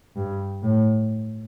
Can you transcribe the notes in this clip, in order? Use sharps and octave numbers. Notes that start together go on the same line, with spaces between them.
G2
A2